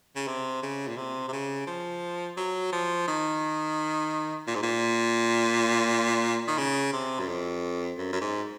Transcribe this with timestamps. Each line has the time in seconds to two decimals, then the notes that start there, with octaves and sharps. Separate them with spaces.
0.15 C#3
0.27 C3
0.62 C#3
0.88 A#2
0.97 C3
1.28 C3
1.32 C#3
1.67 F3
2.37 F#3
2.72 F3
3.08 D#3
4.47 A#2
4.55 G#2
4.63 A#2
6.47 D#3
6.58 C#3
6.93 C3
7.19 F#2
7.28 F2
7.98 F#2
8.12 F#2
8.21 G#2